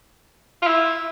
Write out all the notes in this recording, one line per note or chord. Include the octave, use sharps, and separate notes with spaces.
F4
E4